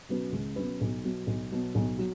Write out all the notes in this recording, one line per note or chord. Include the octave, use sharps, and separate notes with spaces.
B2 F#3 C#4 B4
C#2
B2 F#3 C#4 B4
B1
B2 F#3
B1
B2 F#3
B1
F#3